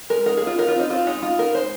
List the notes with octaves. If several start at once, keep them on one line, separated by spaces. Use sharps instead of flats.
G#3 A#4
D#4 A#4
G#4
A#3 F4
D#4 A#4
F4
C4
D#4
C4 F4
G#3 D#4
D#4 F4
A#3 A#4
G#3 C5